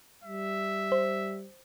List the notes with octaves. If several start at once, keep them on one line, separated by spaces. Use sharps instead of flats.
G3 E5
C5